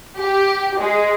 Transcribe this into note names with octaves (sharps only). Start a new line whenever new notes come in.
G4
G#3